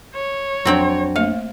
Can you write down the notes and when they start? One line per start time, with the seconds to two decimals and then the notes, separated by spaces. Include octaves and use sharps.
0.15 C#5
0.65 F2 F#3 C4 D4 G5
1.16 A3 A#3 F5